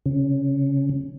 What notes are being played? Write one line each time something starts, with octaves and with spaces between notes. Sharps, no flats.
C#3